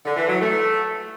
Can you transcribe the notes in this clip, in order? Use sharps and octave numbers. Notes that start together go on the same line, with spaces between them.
D3
E3
F#3
A3